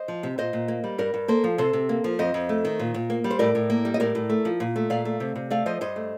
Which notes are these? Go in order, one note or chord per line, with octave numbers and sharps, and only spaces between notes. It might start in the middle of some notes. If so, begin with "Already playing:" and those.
Already playing: C5 D#5
F3
C3
A#2 C5 D#5
A#2
A#3
G3
G2 A#4 D5
G2
A#3 A4 C5
F3
C3 A4 C5
C3
A#3
F3
F2 C5 D#5
F2
A3
D#3
A#2
A#2
A#3
G3
C5
A2 A#4 D5
A2
A#3
G3
D#5
A2 A#4 D5
A2
A3
F3
A#2
A3
A#2 D5 F5
A3
C3
C3
A3 D5 F5
F3 C5 D#5
G2 C5 D#5
A3